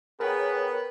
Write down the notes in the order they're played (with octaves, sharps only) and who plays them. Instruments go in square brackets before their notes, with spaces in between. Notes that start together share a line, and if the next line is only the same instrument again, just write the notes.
[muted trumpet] B3 [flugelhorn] G#4 [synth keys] A#4 C#5 G5 [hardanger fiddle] B4